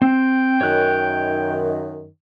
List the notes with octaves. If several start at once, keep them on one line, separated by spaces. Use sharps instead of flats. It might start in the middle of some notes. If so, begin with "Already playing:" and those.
C4 G5
F#2 D#3 C#5 F#6